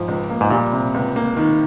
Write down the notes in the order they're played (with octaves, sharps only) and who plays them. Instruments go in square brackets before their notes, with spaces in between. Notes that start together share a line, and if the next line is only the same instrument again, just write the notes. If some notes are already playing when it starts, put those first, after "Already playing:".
Already playing: [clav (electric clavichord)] G#2 [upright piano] F3
[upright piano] C#2
A#3
[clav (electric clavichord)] G#2
[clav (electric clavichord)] A#2 [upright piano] G3
[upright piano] C3
C#2
A#3
D#3